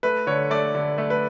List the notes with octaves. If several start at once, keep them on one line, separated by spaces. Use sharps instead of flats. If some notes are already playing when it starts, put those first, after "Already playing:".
A3 B4
D3 C#5
A3 D5
D3
A3
B4